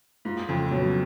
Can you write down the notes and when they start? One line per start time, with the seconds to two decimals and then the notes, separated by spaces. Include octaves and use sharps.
0.25 G#2 F4
0.49 F2 C#3
0.71 B2 F#3